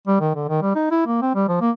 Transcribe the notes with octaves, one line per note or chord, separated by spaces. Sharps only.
G3
D#3
D3
D#3
G3
D#4
E4
A#3
C4
G3
F3
A#3